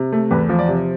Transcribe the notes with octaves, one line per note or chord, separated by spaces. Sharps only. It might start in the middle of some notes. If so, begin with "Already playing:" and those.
Already playing: C3
A3
E2 B4
F3
D5
C3